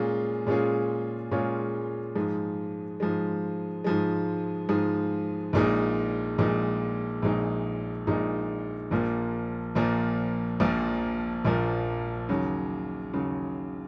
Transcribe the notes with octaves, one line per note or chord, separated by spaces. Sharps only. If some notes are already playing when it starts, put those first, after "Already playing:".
Already playing: A#2 G#3 C#4 F4 G#4
A#2 G#3 C#4 F4 G#4
A#2 G#3 C#4 F4 G#4
G#2 F3 G#3
G#2 F3 G#3
G#2 F3 G#3
G#2 F3 G#3
A#1 A#2 G#3 D#4
A#1 A#2 G#3 D#4
A#1 A#2 G#3 D#4
A#1 A#2 G#3 D#4
A#1 A#2 F3 A#3
A#1 A#2 F3 A#3
A#1 A#2 F3 A#3
A#1 A#2 F3 A#3
D#2 C#3 F#3
D#2 C#3 F#3